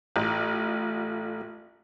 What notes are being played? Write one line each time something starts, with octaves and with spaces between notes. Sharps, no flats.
A1 A3 F4